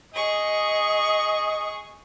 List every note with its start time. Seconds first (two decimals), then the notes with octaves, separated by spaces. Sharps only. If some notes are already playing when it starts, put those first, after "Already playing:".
0.15 G#4 D#5 C#6